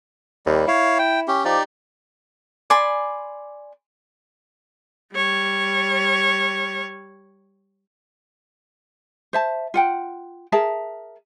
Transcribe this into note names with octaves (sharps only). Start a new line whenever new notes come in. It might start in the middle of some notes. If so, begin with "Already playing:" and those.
D#2 G3
E4 C#5 F5
G5
C#4 G4
F3 D#4 G4 D5
D5 G#5 B5 C6
G3 C#5
C5 E5 A5
F4 F#5 G5
G#4 A#4 E5 A5